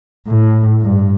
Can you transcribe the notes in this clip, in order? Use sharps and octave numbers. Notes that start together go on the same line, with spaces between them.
A2
G2